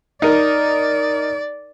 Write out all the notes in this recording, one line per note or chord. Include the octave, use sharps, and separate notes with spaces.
D#4 A#4 D5